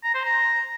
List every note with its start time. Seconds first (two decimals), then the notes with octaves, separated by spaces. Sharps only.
0.04 A#5
0.14 C5
0.25 A#5